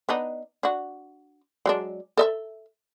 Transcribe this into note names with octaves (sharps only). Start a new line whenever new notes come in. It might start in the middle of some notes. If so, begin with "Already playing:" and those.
B3 D4 D#4
D4 F#4
F#3 G#3 D4
A4 D#5 E5